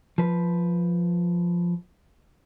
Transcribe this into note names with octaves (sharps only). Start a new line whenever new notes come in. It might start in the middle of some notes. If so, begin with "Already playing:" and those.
F3 B4